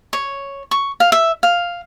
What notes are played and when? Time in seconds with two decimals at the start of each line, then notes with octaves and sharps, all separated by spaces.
0.13 C#5
0.71 C#6
1.00 F5
1.12 E5
1.43 F5